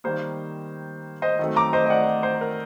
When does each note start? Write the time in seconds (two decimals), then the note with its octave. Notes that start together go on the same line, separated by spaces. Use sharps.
0.04 D#3 G3 A#3 C5
1.22 C5 D#5
1.39 D#3 F#3 A3 C4
1.56 A#5 D6
1.73 C5 D#5
1.86 D#5
1.90 D5 F#5
2.23 C5
2.41 A#4